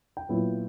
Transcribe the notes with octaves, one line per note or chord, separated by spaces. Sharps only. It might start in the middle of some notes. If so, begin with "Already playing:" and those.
G5
A#2 F#3 B3 E4